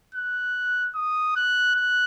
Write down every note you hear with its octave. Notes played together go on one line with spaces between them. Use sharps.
F#6
D#6
F#6
F#6